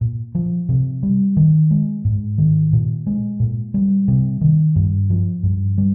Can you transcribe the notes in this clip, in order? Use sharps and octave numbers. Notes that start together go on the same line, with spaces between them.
A#2
F3
C3
G3
D#3
G#3
G#2
D#3
A#2
G#3
A#2
G3
C3
D#3
G2
F3
G2
G3